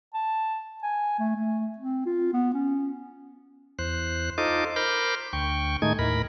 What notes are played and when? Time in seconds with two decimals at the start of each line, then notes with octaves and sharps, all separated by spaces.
0.14 A5
0.83 G#5
1.19 A3
1.35 A3
1.78 C4
2.06 F4
2.34 B3
2.54 C#4
3.79 E2 C5 F#6
4.38 D#4 F4 A4 C5 D#5 D6
4.76 A#4 C5 B5 D6 F6 G6
5.33 D2 G5 C#6
5.82 A2 D#3 G#3 A3 D#4 G#6
5.99 D#2 A2 A#4 B5